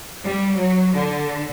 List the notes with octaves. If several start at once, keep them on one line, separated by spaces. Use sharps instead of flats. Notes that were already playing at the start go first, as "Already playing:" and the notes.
G3
F#3
D3